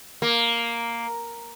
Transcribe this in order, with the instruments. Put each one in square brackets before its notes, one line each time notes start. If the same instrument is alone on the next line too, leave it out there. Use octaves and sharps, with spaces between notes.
[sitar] A#3